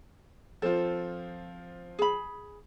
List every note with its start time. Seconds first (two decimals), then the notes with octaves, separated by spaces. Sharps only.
0.62 F3 C4 F4 A4
1.99 G#4 B5